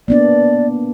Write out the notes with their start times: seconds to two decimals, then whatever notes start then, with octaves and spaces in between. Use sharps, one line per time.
0.08 A#3 B3 D4 D5